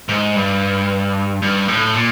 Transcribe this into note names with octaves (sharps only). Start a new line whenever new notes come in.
G#2
G2
G2
A2
A#2